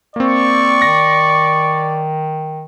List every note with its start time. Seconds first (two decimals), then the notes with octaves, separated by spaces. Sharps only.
0.16 A#3 C4 D5 C#6
0.82 D#3 A#6